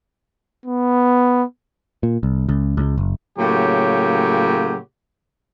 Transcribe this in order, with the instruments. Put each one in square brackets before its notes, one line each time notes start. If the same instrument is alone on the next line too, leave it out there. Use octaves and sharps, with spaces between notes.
[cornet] B3
[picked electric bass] A#2
C2
C#2
C#2
F#1
[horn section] A2 C#3 F#3 A#3 G4